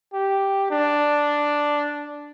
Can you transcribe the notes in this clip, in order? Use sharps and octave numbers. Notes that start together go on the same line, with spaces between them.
G4
D4